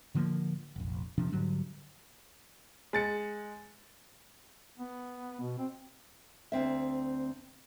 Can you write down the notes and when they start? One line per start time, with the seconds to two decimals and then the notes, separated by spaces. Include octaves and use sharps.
0.14 A2 D3 F3 A#3
0.76 F1 A#1
1.18 D#1 C3 F3 D4
1.32 G#2 D3 F#3 G3
2.93 G#3 A6 C#7
4.78 B3
5.41 B2
5.59 C4
6.52 D2 C4 E5